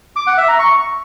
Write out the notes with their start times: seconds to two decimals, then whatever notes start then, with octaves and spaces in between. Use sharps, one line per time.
0.16 D6
0.27 F#5
0.38 E5
0.48 A#5
0.59 C#6